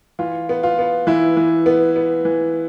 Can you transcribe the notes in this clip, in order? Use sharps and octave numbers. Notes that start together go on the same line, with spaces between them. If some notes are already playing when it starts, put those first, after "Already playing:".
E3 F4
B3
F4
B3
E3 E4
E3
B3
B3
E3